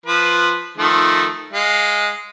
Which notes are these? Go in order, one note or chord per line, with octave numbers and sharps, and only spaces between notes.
F3 B4
D#3 F3 A3
G#3 F5